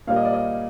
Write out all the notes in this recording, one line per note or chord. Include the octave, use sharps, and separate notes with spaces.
A#2 G3 A#3 F5
D#5
D5
D#5